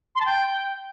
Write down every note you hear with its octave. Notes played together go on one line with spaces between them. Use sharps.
C6
A5
G5